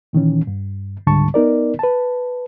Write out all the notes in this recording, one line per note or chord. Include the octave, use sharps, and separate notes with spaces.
A#2 D#3 E3 C#4
G2
C#2 G#2 D3 G3 A5 C#6
B3 D#4 A#4 D5
B4 A5